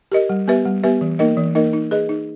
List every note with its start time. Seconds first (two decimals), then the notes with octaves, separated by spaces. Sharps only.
0.12 G4 A#4 D#5
0.29 G3
0.48 B3 G4 B4 E5
0.65 G3
0.83 B3 G4 B4 E5
1.01 E3
1.19 A#3 D#4 A#4 D#5
1.37 E3
1.55 A#3 D#4 A#4 D#5
1.73 D#4
1.91 G#4 B4 D#5
2.09 D#4